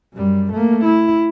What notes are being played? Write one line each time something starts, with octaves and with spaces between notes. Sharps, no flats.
F#2 G3
A3 A#3
E4